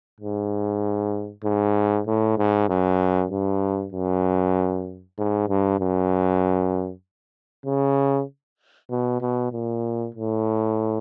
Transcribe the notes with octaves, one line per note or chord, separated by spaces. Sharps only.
G#2
G#2
A2
G#2
F#2
G2
F#2
G#2
G2
F#2
C#3
B2
B2
A#2
A2